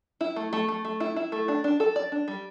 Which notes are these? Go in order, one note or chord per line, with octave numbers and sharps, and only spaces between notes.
E4
A3
A3
A3
A3
E4
E4
A3
D4
D4
A4
D5
D4
G3